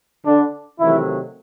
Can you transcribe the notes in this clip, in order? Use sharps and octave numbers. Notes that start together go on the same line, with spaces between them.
D3 D4
C3 D#3 E3 F#3 A3 E4